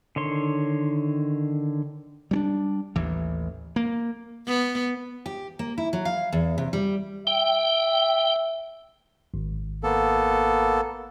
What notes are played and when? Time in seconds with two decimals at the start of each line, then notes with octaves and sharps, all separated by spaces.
0.16 D3 D#3 C#5 C6
2.31 G3 C#4 D4
2.96 A1 D#2 E3
3.76 A#3
4.47 B3
5.26 G4
5.59 A#3
5.78 E4
5.93 F#3
6.05 F5
6.32 E2
6.58 C3
6.73 G3
7.27 E5 G5
9.34 G#1
9.84 A#3 B3 A4